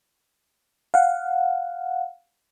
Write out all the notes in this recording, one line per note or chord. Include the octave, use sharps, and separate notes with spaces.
F5 F#5